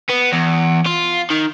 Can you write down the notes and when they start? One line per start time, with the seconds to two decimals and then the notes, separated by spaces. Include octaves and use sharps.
0.10 B3
0.33 E2
0.86 F4
1.30 D#3